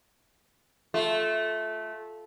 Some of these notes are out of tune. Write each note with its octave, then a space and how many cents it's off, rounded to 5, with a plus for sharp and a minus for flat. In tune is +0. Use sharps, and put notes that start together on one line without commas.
A3 -15 F4 +0